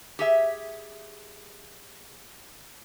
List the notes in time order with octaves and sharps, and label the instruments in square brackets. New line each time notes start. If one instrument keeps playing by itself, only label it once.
[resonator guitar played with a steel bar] G4 G#4 E5